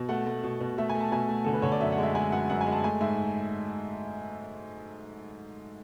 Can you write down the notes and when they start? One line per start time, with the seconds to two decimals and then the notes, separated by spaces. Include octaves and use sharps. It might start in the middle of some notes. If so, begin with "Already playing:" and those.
Already playing: B2
0.09 A3 F#5
0.27 A3
0.44 B2
0.60 B2
0.78 A3 E5
0.89 G#5
0.95 A3
1.01 A5
1.12 B2 G#5
1.29 A3
1.44 D3 A4
1.53 B4
1.62 D3 C#5
1.72 D5
1.80 F#2 E5
1.92 F#5
1.98 G#3
2.03 E5
2.15 G#3 G#5
2.32 F#2 F#5
2.50 F#2 F#5
2.61 G#5
2.67 G#3
2.72 A5
2.84 A3 G#5
3.01 G#2 E5